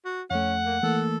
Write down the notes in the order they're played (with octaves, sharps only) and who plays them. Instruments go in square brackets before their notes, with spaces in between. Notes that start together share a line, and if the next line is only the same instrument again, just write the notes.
[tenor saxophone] F#4
[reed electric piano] F2 A3 [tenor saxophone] C#4 [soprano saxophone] F#5
[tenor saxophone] A#3
[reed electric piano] E3 A3 A#3 [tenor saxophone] A4